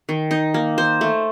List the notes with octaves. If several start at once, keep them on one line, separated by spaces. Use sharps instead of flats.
D#3
D#4
A#3
C5
A3